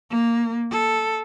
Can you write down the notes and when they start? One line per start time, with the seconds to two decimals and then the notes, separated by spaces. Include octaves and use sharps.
0.10 A#3
0.71 A4